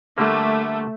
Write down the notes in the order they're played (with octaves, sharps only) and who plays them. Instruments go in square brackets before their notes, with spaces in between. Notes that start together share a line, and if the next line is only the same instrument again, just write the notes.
[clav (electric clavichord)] D3 G3 A#3 [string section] A3